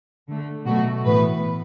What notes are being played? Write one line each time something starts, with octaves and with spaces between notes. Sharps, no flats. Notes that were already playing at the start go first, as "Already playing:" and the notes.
D3 A3
B2 F#3 A3 F#4
A2 E3 B3 B4